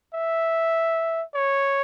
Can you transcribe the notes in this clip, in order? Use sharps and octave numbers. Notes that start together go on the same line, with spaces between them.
E5
C#5